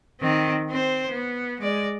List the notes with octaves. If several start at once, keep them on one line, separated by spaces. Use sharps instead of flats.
D#3 C4
C4 C5
B3
G#3 D5